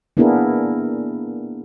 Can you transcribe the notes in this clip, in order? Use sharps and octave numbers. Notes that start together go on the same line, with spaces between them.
A#3 B3 D4 E4 G#4 A#4